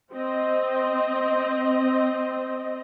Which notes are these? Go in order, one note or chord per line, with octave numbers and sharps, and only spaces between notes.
C4 D#5